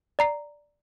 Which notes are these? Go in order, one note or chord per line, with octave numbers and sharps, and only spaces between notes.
D5 A#5 C7